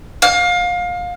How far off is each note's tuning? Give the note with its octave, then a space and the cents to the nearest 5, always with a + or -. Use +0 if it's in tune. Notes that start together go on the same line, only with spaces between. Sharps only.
F5 +25